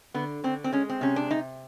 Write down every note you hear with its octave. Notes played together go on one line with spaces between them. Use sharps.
D3 B3
D3 C4
C4
G#3 C#4
C4
C3 C#4
D4
C3 D#4